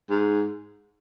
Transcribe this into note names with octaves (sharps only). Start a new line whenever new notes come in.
G#2